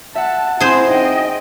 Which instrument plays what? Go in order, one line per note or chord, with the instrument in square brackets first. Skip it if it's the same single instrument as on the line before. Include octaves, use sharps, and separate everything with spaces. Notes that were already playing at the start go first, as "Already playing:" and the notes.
[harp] E5 F#5 [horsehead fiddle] A5
[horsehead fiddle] C4 E4 [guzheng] G#4 C5
[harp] D#4 [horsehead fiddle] D#5 G5